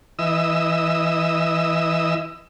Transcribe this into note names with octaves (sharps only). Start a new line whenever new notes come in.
E3 D#5 E6